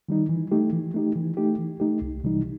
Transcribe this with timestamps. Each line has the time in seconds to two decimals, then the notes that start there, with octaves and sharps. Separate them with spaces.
0.09 D#3 G3 D#4
0.29 E3
0.52 A3 D#4 G4
0.73 E3
0.94 A3 D#4 G4
1.16 E3
1.37 A3 D#4 G4
1.59 E3
1.80 A3 D#4 G4
2.02 C2
2.24 C3 E3 G3 D#4